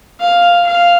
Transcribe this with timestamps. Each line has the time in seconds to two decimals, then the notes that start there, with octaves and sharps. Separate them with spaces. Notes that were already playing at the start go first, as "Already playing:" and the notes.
0.20 F5
0.66 F5